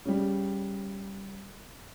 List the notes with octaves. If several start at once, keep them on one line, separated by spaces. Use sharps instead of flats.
C#3 G3